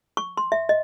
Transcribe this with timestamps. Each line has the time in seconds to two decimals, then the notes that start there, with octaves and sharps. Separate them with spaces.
0.17 C#6
0.37 C6
0.52 E5
0.69 D#5